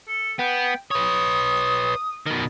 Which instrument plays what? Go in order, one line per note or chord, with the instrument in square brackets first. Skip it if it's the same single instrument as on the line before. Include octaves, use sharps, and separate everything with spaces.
[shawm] A4
[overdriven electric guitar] B3 [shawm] G5
[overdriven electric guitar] B4 C#5 [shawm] D#6
[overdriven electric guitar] B2 D#3